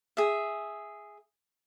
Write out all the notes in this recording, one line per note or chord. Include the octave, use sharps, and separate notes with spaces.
G#4 E5